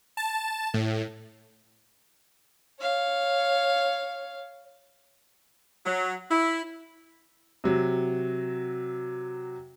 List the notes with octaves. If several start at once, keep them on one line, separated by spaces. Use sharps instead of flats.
A5
A2
C#5 F5
F#3
E4
C3 F#3